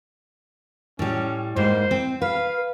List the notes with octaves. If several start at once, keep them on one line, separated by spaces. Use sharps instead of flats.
A2 G3 C#4
G#2 G3 A#3 C5
C4
B4 F5